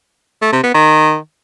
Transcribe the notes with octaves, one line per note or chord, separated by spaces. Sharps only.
A3
C3
B3
D#3